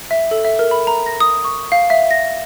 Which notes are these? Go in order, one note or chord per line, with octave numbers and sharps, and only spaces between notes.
E5
A4
E5
A#4
B5
A#5
A#6
D#6
C#6
F5
E5
A#6